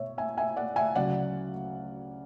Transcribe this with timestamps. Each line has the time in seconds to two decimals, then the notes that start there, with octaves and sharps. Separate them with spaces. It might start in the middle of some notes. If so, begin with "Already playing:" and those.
Already playing: B2 A3 C#5 E5
0.18 E5 G#5
0.37 E5 G#5
0.57 D5 F#5
0.76 E5 G#5
0.95 D2 C#3 F#3 D5 F#5